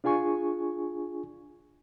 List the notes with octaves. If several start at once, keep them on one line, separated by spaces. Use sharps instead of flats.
D4 F4 G#4 G#5 C#6